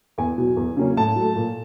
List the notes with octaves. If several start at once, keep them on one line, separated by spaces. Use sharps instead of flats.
E2 G#5
B2 F#3
E2
C#3 F#3 A#3 C#4
A2 A5
F#3 A3
A#2